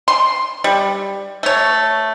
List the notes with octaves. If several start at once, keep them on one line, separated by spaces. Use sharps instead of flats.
C6
G3
A3 C#5